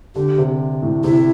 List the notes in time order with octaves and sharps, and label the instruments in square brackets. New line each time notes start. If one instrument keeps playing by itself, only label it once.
[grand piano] D3 [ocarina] G4
[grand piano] C3
A2
[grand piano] C3 [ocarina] E4